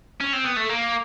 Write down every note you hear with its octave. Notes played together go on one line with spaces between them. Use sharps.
C#4
C4
B3
A3
A#3